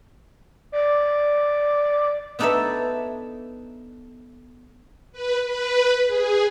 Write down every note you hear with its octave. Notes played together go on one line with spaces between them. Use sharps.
D5
B3 D4 D#4 A4 C#5 E5
B4
B4
G#4